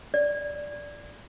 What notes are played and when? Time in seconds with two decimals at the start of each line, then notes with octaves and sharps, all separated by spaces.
0.14 D5